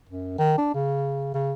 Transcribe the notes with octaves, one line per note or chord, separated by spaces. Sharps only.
F#2
D#3
D4
C#3
C#3